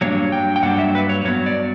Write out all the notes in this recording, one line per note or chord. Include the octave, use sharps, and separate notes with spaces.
G2 F#3 A#3 D4 C#5
G5
G5
G2 F#3 A#3 D4 F#5
E5
B4
C#5
G2 F#3 B3 C#5
D5